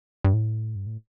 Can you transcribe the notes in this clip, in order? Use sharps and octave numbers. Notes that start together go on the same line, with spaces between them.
G2
A2
G2
A2